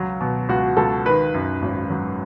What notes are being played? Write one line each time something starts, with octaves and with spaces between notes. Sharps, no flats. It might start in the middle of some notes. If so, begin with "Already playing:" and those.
Already playing: C#2 F#3
B2
C#2 F#4
C#2 A4
D#3 B4
F#2
G#1
F#3